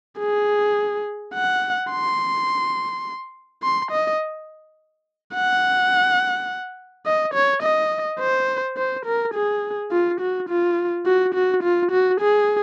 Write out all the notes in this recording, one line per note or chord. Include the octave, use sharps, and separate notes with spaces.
G#4
F#5
C6
C6
D#5
F#5
D#5
C#5
D#5
C5
C5
A#4
G#4
F4
F#4
F4
F#4
F#4
F4
F#4
G#4